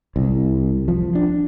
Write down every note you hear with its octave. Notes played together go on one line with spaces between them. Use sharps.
C2
F3
D4